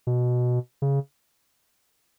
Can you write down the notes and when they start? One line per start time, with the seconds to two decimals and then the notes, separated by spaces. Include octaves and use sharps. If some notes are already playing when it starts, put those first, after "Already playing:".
0.07 B2
0.82 C#3